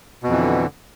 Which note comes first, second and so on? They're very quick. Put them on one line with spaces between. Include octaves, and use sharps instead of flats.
B2 F2 E3 D3